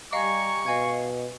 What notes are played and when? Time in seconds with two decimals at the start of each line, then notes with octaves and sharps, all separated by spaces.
0.13 G3 G4 D#5 F5 G#5 A#5 C#6
0.66 B2 D#5 F5 G#5 G#6